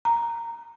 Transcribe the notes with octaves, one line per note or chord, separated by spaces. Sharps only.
A#5